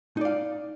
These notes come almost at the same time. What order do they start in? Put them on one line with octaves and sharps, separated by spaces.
D#4 D5 F5